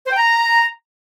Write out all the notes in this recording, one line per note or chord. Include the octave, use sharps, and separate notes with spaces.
C5
G5
A#5